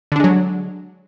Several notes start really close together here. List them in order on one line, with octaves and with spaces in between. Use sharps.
D3 D4 G#3 F#3